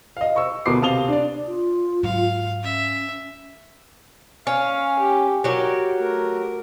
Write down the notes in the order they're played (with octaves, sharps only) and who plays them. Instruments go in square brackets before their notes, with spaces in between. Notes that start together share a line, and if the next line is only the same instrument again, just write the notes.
[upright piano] D#5 F5
C#6 E6
D2 B2 B3 A#4 D6 C7
C3 F5 A5 D#6 F7 G7
D4 D5
[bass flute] F4
[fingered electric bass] G#2 F#3 [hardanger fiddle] F5
[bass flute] C#4 [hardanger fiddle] E5
[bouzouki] C#4 [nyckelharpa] F5
[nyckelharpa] G4
[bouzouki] F#3 G4 [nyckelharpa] A#4
[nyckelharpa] A3 A#4